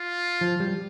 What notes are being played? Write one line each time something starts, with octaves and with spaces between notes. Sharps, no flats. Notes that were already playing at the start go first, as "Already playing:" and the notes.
Already playing: F4
F3
G3